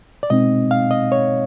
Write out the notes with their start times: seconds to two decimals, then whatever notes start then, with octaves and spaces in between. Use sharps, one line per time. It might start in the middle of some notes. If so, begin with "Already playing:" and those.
0.23 D5
0.30 B2 G#3 C4 D#4 D#5
0.71 F5
0.91 D#5
1.12 C#5